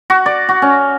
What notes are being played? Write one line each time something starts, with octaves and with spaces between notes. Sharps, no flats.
F#4
D5
F#4
C#4